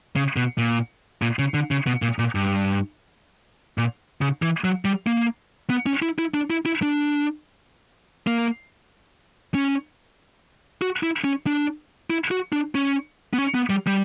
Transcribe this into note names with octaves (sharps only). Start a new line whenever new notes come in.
C#3
B2
A#2
A#2
C#3
D3
C#3
B2
A#2
A#2
G2
A#2
C#3
E3
F#3
G3
A#3
B3
C#4
E4
E4
D4
E4
E4
D4
A#3
C#4
F#4
E4
C#4
D4
E4
F#4
D4
C#4
B3
C#4
B3
G3
G3